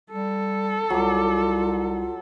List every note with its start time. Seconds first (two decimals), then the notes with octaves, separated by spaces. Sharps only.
0.11 G3 A4
0.90 C2 F#3 F4 D6